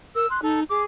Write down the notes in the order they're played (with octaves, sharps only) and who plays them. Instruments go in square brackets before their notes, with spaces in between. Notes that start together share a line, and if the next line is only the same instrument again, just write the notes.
[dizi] A#4 [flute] E6
[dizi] C6 [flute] F#6
[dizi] D#4 [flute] A4
[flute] G#4 [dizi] D6